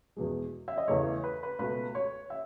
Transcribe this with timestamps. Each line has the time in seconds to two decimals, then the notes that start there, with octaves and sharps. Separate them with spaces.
0.17 E2 B2 G#3
0.68 E5
0.78 D#5
0.88 E2 C#3 E3 A3 C#5
1.24 B4
1.43 B4
1.59 C#2 B2 A3 B4
1.95 C#5
2.30 E5